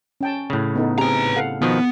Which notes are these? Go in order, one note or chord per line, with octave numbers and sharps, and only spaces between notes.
C#4 G5 A5
A2 C#3
B3 D#4 A4
C4 G4 G#4 B4 A#5
A4 F5 F#5
B2 D#3 F3 B3